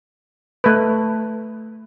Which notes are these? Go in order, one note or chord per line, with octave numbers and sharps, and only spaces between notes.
A3 B4